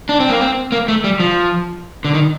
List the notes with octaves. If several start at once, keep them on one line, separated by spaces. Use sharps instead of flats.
D4
C4
A#3
C4
A#3
A3
G3
F3
D3
D#3